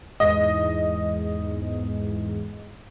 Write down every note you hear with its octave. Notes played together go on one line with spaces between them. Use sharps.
E2 G#2 D#5